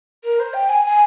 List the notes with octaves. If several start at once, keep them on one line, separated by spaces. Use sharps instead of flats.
A#4
C5
G5
G#5
G#5